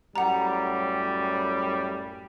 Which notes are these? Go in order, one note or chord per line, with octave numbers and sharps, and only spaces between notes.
F#2 A2 G3 F#5 A#5